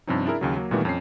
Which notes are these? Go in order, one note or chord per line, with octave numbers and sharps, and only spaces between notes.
G2 C3 F3 C4 C#4 D#4
D4 E4 G#4 A#4 E5
D#2 C#3 F#3
F#3 A#3
A#2 D#3 E3 G3 A3 B3
F2 C#4 C7